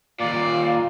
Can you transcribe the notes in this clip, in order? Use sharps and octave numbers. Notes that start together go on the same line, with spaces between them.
D#2 A#2 F4 D5 F5